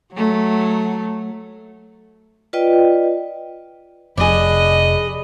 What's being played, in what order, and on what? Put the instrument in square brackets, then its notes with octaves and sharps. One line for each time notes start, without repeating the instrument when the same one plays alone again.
[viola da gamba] F#3 A3
[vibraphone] F4 B4 D5 D#5 G5
[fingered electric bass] F1 [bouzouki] D4 G#4 [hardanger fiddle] D#5 B5